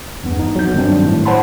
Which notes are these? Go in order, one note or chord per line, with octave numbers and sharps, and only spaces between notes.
E2 G2 B3
D#4
F#3 B3 G6
G2 D#3 F#3 G3 C4 D4
A2
C5 C#5 F#5 A5 B5 C6